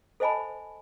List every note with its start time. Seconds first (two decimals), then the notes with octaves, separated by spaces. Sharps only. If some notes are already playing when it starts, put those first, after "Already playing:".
0.20 A4 C5 D#5 G#5 A5 B5